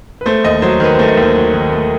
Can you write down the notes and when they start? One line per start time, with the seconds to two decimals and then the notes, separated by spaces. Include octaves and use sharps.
0.21 B4
0.26 A3 C5
0.44 D#2 D#5
0.62 F#3 C5
0.80 D#3 B4
0.94 C5
0.99 A3
1.08 D#5
1.17 D#2 C5
1.36 F#3
1.54 D#3
1.72 A3